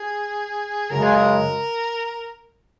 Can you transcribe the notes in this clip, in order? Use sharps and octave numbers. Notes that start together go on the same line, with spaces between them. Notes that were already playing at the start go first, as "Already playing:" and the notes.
Already playing: G#4
F#2 C#3 G#3 A#4
G#4
A#4